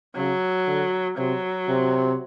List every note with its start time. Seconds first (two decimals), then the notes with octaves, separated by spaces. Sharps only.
0.16 C#3 F#3
0.67 D3
1.18 C3 F#3
1.69 C3